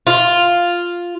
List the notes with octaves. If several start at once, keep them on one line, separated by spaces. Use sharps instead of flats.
F4